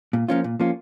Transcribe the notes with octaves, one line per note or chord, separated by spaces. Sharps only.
A#2
F3 A#3 C#4 F4
A#2
F3 A#3 C#4 F4